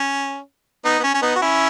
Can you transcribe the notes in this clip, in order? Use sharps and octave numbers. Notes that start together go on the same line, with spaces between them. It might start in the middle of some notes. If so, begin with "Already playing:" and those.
Already playing: C#4
B3 D#4
B3
C#4
C#4
B3 D#4
F#4
C#4 E4